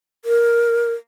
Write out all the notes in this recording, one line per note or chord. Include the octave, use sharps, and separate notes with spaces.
A#4